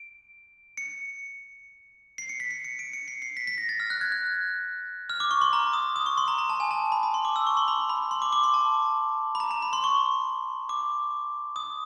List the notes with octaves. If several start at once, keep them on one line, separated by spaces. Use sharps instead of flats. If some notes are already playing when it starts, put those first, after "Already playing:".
Already playing: D7
C#7
C7
C#7
B6
C7
C#7
D7
C#7
C7
C7
B6
B6
A#6
A6
F6
F#6
G#6
F#6
F6
D6
C#6
C6
A#5
D#6
D#6
C#6
C6
A#5
A#5
A5
G#5
A5
B5
B5
C6
D6
E6
C#6
C6
B5
B5
C6
D6
D6
C6
A5
B5
A#5
A#5
B5
C6
C#6
D6
D#6